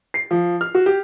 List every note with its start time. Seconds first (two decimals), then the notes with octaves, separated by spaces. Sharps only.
0.14 C7
0.31 F3
0.61 F6
0.75 F#4
0.86 G4